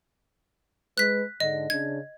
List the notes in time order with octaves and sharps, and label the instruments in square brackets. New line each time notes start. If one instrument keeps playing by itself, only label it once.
[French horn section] G#3 B4 [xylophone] F#6 B6
[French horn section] G#2 D3 [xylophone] D#5
[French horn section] C#3 D4 [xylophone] G#6